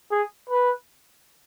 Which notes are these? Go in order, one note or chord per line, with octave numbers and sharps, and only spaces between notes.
G#4
B4